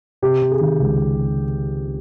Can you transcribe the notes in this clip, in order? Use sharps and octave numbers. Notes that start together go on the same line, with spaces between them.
C3 G4
C3
G#4
D#3
C#2